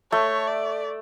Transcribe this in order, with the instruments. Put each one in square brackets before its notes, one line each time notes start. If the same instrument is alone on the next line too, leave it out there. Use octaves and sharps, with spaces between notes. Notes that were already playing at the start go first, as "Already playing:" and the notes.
[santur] A3 [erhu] C#5
[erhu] D5